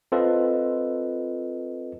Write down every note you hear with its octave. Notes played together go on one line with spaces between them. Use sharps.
C4 F4 A4 B4 D#5